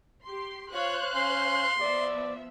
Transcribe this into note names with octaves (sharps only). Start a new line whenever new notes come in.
G4 C6
F4 C5 C#5 F5 F#6
C#4 C6 C7
F3 B3 D5 E5